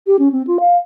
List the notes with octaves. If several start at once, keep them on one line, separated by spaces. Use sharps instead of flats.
G4
C#4
C4
F4
F5